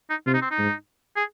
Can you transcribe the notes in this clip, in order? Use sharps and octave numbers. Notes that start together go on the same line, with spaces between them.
D#4
C3 F4
D#4
C4
D#4
G#2
G#4